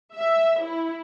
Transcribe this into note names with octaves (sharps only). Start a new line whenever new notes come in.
E5
E4